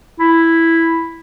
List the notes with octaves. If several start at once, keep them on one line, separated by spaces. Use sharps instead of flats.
E4